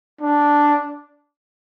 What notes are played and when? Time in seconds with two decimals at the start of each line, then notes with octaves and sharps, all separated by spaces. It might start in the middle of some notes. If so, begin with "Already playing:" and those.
0.21 D4